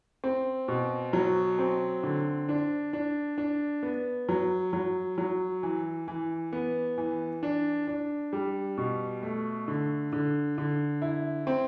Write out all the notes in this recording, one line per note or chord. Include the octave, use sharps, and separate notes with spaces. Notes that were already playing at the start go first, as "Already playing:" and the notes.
C4
B2
F#3
C4
D3
D4
D4
D4
B3
F#3
F#3
F#3
E3
E3
B3
E3
D4
D4
G3
B2
A3
D3
D3
D3
E4
C4